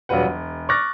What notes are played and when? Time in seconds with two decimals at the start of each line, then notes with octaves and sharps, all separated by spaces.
0.09 E1 F#3 G3 F4 B4 F#5
0.25 E1
0.69 C#6 D6 F6 F#6 A6 A#6